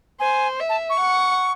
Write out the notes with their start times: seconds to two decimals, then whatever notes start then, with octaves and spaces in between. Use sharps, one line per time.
0.20 C5 G#5
0.60 E5
0.69 A5
0.90 C#6
1.00 F#5